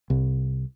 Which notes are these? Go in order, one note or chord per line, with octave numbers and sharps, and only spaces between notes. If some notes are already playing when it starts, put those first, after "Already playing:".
C2